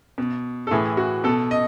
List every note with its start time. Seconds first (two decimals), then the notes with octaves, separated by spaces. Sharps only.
0.18 B2
0.67 A4
0.71 A2 E3 G#4
0.97 F#4
1.24 B2 A4
1.51 D#5